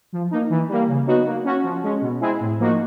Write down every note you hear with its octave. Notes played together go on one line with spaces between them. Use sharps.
F3
A#3 D#4
E3
G3 A#3
C#3
F#3 B3 D#4 F#4
A#3
C#4 F#4
F3
G#3 C#4
B2
G#3 C4 E4 G#4
A2
F3 A#3 D#4 F#4